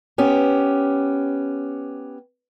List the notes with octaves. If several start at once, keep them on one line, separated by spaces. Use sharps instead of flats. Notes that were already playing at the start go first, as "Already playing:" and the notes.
B3 C#4 G4